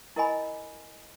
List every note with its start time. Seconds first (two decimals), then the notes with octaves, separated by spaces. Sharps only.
0.16 E4 A#4 D#5 G#5 B5